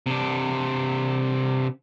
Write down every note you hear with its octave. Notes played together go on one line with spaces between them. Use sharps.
C3 D4